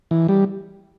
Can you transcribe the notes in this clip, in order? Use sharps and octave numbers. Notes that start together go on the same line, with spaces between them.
E3
G3